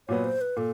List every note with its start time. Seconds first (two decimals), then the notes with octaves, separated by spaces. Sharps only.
0.08 A#2 F#3 B3 C#5
0.24 C5
0.41 B4
0.56 A#2 A4